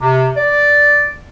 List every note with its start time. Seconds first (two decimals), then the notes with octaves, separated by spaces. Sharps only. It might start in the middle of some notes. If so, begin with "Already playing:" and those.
0.01 C3
0.36 D5